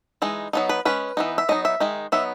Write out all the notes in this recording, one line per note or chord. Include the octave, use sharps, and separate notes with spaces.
E3 G#3 D#4
F#3 B3 D#4
B4
G#3 C#4 B4
E3 B3 D#4
E5
F#3 B3 D#4 D#5
E5
D#3 G#3 D#4
F#3 B3 D#4 E5